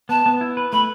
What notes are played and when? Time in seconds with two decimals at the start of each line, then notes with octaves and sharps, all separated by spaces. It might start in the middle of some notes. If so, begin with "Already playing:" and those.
0.09 B3 A5
0.26 B3
0.41 E4
0.57 B4
0.72 A3 B5